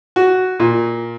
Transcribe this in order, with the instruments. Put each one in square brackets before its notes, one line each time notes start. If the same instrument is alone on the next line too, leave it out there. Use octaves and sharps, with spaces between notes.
[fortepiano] F#4
A#2